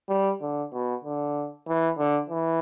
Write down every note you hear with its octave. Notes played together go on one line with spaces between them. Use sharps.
G3
D3
B2
D3
E3
D3
E3